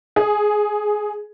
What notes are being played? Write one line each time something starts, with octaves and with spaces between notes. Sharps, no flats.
G#4